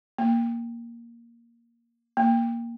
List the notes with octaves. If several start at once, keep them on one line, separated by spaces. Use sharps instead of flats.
A#3
A#3